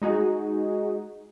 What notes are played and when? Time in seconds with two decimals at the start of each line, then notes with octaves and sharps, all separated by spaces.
0.02 G#3 D#4 F#4 G#4